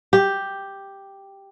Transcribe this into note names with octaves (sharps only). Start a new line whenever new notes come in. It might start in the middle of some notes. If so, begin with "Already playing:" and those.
G4